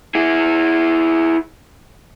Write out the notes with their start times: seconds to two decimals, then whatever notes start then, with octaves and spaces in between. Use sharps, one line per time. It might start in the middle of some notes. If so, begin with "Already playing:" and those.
0.15 E4 G#4